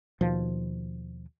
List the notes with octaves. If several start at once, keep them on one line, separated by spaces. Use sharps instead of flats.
D#2 B2 F3